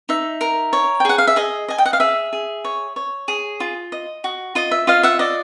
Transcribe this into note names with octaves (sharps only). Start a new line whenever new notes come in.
D#4 E5
A#4
C#5
G5
G#4 F#5
F5
E5
G#4 D#5
D#5 G#5
G5
F#5
F5
G#4 E5
G#4
C#5
C#5
G#4
F4
D#5
F#4
F4 D#5
E5
F4 D#5 F5
E5 F#5
D5 D#5